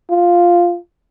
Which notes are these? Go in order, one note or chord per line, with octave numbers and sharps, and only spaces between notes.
F4